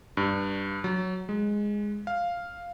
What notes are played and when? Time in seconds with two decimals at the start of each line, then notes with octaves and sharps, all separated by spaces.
0.17 G2
0.84 F#3
1.29 G#3
2.07 F5